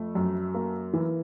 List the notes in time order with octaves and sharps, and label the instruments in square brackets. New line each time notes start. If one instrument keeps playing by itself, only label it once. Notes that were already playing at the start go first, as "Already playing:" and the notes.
Already playing: [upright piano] F2 A3
F#2
A#3
E3